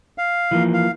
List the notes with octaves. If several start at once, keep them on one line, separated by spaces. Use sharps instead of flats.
F5
E3 F3 A#3
F5